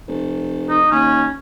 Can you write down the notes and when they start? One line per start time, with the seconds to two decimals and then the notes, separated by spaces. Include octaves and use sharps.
0.08 F1
0.69 D#4
0.91 D#2 C#4